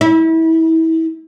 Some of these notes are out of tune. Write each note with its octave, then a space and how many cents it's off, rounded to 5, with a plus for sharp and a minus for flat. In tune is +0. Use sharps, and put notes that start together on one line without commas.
E4 -30